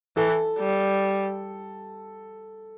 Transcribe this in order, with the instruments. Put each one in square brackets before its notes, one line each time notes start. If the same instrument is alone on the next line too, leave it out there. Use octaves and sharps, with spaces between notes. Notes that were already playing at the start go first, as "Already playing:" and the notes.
[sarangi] E3 [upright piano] A4
[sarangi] G3